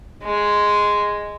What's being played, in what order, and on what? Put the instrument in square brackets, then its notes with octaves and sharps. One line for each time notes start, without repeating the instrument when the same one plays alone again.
[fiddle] G#3